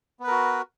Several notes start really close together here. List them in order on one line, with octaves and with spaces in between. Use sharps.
B3 B4 A#4 F#4